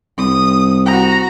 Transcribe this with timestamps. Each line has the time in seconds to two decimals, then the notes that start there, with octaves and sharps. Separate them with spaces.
0.18 C2 D#6
0.86 F#4 A#5